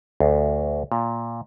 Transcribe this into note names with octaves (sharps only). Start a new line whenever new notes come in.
D2
A#2